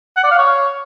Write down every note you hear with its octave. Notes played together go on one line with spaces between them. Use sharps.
F#5
D5
F5
C#5